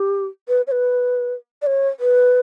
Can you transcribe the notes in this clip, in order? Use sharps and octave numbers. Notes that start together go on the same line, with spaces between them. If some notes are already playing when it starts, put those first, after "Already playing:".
Already playing: G4
B4
C#5
B4
D5
C#5
B4